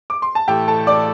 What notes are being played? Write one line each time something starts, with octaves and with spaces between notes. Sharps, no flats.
D6
C6
A5
A2 E3 A3 G4 G5
A4 A5
D5 D6